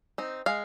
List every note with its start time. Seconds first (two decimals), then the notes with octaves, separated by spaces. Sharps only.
0.18 C4 D#4
0.46 G#3 F5